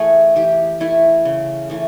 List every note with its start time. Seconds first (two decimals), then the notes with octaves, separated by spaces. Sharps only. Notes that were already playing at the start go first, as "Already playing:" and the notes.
Already playing: E3 A3 G#4
0.36 E3 G4
0.80 A3 E4
1.25 C#3
1.70 E3 A3